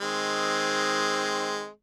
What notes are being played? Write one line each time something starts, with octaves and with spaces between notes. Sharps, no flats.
D#3 G#3 C4